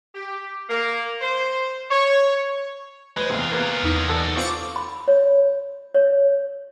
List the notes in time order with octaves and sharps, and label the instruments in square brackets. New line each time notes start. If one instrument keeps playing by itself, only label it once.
[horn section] G4
A#3
C5
C#5
[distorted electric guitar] G#3 [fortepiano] B4 C5
[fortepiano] E2 C3 [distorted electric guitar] F4 G#4
[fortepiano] A#3 B3
[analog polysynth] E2 D#4
[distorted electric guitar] B3 D5 [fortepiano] A4
[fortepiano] C4 F4 [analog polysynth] C#6 D6 A6
[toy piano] B5
C#5
C#5